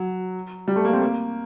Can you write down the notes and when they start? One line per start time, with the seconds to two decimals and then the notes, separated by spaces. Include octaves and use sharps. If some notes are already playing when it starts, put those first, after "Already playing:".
Already playing: F#3
0.68 G3
0.76 A3
0.85 A#3
0.93 C4
1.01 A#3